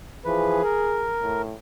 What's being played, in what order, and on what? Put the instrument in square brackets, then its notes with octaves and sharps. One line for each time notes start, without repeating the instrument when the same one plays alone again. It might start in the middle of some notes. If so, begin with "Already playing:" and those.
[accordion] E3 F3 B4 [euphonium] G#4
[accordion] A#4
[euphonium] A2